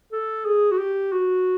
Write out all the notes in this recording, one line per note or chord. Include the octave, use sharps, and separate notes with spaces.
A4
G#4
F#4
G4
F#4